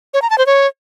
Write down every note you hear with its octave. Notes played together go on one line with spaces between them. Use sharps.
C#5
A#5
A5
C5
C#5